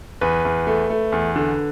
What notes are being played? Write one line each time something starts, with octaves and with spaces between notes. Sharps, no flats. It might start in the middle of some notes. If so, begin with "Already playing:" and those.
E2 B4
E2
A3
A3
E2
D3